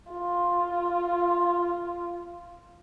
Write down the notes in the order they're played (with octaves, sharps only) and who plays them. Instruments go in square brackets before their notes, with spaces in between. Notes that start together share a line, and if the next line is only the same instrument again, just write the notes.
[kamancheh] F4